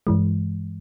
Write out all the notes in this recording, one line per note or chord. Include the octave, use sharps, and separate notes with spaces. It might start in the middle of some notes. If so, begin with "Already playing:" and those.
G2 E3 G#3